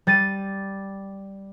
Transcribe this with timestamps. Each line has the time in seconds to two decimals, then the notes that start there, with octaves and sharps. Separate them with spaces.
0.07 G3 A6 D#7